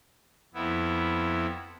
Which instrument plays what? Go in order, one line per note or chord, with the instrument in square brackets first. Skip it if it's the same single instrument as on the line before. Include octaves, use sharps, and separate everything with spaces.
[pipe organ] F2 B3 E4